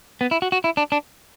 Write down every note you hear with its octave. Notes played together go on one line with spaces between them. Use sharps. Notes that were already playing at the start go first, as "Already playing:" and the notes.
B3
E4
F#4
F#4
E4
D4
D4